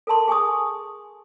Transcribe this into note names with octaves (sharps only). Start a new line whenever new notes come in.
A4 A#4 A5 C6
G#4 G#5 C#6 D#6